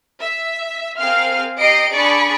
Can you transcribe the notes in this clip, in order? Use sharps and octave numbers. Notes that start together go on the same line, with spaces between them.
E5
C4 G#4 A#4 F5 C6 F6
G4 D#5 A#5 C7 D7
D4 G#4 D5 B5 C#6